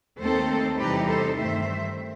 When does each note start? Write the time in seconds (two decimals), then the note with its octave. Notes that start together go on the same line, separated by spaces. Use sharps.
0.20 D#2 D#3 A3 C4 D#4 A4 C5
0.78 E2 C3 E3 G3 D#4 G4 B4
1.07 A4 C5
1.37 G2 D#3 A3 C4 C5 E5